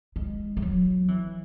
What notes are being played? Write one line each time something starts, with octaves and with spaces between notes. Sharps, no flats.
G#3
G#3
F#3
E3